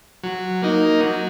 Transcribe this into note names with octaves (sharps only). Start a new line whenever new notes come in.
F#3
A#3 D#4
F#3